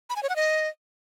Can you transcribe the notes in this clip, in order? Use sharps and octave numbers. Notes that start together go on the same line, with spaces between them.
B5
G#5
C#5
F#5
D#5